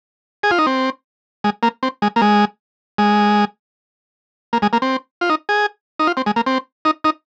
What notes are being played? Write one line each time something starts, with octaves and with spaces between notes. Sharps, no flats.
G#4
F4
D#4
C4
G#3
A#3
C4
G#3
A#3
G#3
G#3
A#3
G#3
A#3
C4
F4
D#4
G#4
D#4
F4
C4
G#3
A#3
C4
D#4
D#4